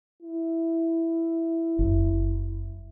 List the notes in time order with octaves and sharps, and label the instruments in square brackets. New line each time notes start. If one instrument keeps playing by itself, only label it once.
[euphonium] E4
[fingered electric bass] F#1